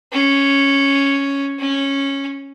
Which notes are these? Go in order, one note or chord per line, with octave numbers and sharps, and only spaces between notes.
C#4
C#4